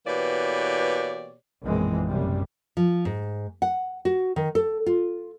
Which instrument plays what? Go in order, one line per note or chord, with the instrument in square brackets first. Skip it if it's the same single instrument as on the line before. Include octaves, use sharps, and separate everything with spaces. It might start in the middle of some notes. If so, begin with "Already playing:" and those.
[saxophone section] B2 E3 A#3 G4 C#5 D5
[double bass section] A#1 F#2 B2 E3 G#3 C4
F#1 F#2 C3 G3
[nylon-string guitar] F3
G#2
F#5
F#4
D#3
A4
F4